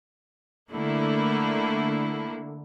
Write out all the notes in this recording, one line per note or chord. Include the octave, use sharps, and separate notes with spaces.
D3 A3 A#3 E4